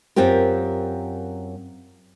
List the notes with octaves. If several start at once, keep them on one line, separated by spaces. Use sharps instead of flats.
F#2 C4 F4 G4 A#4